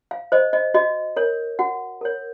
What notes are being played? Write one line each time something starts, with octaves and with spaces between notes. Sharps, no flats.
F5
C5 D#5
D#5
F#4 D#5
A#4 C#5
F#4 F#5
A#4 C#5